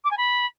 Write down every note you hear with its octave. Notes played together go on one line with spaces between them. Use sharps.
D6
G#5
B5